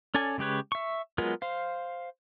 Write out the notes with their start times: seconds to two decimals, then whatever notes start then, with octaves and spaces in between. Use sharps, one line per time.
0.14 C#4 A4 D5 G#5
0.38 C#3 G#3 G4 B4 C#5
0.72 E5 C#6
1.18 F#3 G#3 B3 F4 A#4
1.42 C5 F5